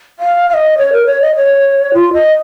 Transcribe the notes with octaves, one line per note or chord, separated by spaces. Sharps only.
F5
F5
D#5
C#5
A#4
C#5
D#5
C#5
F4
D#5